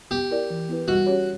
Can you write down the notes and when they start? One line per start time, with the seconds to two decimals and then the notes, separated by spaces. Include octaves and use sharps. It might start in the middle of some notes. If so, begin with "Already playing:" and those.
0.11 B3 G4
0.31 E4 A#4 D5
0.50 E3
0.69 B3 E4 B4
0.88 G3 F#4
1.06 C#4 G4 C#5